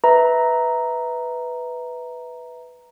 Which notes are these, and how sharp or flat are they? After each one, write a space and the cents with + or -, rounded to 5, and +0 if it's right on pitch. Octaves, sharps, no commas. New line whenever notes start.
B4 +0 E5 -20 A#5 +0